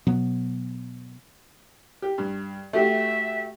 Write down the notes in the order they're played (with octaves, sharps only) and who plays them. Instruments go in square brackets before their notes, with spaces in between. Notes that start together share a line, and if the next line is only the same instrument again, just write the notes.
[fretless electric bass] B2 F#3 B3
[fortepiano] G4
G2
[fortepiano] A3 F#4 G4 [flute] E5